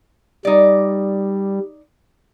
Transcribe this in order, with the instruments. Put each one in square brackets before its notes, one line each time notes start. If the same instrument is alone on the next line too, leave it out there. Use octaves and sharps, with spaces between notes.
[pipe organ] G3 [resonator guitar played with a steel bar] D#4 D5